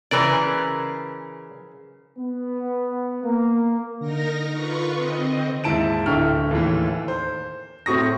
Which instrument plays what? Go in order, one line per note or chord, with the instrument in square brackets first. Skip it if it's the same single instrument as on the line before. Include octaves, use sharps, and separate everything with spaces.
[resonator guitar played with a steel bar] C#3 A#4 B4 [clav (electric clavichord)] E3 D5
[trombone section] B3
A#3
[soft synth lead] D3 [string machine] D#4 A#4 A#6
[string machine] F4 B4 C#6
C4 D#5
[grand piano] D#2 G#2 E4 A5 D7 E7
D1 D3 E4 G5 C#6 F6
D#2 A2 E3
C5
A2 C4 F#4 C#6 D#6 A#6